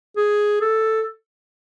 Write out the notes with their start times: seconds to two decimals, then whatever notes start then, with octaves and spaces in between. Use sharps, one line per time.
0.17 G#4
0.61 A4